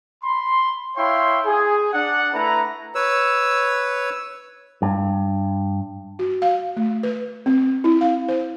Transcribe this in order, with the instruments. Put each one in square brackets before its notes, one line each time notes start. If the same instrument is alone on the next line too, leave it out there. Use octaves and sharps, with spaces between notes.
[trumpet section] B5 C6
E4 C#5 F5 G5 C6
G#4
D4 F#5
A3 E4 B4 A#5
[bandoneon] B4 C#5 E6
[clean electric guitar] G2
[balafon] F#4
F5
A3
B4
C4
E4
F5
C5